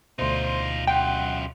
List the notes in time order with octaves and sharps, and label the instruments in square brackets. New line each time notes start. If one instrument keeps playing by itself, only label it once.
[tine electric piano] D2 B2 [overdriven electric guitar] D#4 F4 [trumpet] C5
[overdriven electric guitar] F#2 F4 [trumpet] F#5 [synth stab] G5